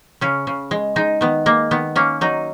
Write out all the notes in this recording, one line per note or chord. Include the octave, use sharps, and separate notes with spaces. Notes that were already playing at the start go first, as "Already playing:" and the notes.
C#3 C#4
C#3
G#3
G#3 D#4
D#3 B3
G#3 A#3
D#3 B3
A#3 C#4
F#3 D#4